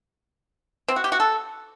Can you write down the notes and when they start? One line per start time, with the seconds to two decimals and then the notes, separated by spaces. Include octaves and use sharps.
0.88 C4
0.96 F#4
1.04 G4
1.12 F#4
1.20 A4